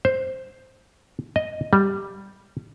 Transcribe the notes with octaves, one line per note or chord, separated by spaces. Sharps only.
C5
D#5
G3